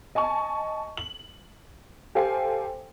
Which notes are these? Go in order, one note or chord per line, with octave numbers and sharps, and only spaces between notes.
D#5 G#5 A5 C#6
F#7
G4 A4 C5 F5 G5 G#5